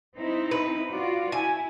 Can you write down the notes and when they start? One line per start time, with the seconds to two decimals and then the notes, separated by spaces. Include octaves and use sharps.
0.16 C4 D#4 E4
0.51 B4
0.91 F4 F#4 D5
1.32 E4 G#5